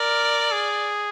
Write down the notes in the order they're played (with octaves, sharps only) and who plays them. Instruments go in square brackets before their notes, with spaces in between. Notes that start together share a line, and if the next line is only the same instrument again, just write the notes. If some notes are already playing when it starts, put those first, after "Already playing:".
Already playing: [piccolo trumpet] A#4 [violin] D5
[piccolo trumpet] G#4